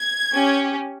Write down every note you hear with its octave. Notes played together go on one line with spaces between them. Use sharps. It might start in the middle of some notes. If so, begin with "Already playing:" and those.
Already playing: G#6
C#4 G4